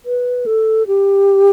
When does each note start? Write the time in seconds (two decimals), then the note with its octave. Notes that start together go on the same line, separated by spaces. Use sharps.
0.06 B4
0.46 A4
0.87 G4